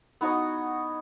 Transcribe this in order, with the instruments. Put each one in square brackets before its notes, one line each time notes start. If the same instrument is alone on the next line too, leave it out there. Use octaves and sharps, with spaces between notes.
[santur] B3 D#4 F#4 C#5